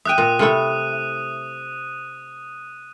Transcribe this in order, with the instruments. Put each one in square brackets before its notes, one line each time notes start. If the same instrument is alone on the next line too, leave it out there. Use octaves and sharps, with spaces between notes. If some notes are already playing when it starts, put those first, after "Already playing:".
[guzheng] E5 G5 [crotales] D#6 F#6 D#7
[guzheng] A#2
C3 A3 E4